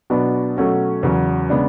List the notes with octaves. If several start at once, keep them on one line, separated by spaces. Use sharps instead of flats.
B2 F#3 B3 D4
B2 F#3 A3 C#4 F#4
E2 C#3 F#3
C#3 G#3 B3 D4